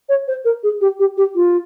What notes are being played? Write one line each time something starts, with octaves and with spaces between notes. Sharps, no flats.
C#5
C5
A#4
G#4
G4
G4
G4
F4